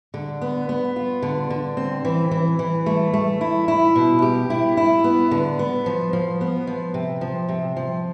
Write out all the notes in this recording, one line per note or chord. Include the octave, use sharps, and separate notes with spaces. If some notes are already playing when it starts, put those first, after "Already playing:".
D3
B3
B3
F4
D3
D3
C4
E3
E3
E3
A3
A3
E4
E4
B2
G4
E4
E4
B3
D3
B3
F3
F3
B3
F3
C3
F3
C3
F3